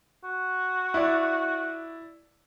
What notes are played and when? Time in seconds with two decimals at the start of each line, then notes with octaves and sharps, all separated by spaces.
0.24 F#4
0.94 E4 D5